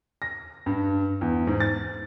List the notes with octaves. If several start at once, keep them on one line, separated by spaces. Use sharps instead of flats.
A#6
G2
E2
G#2
A6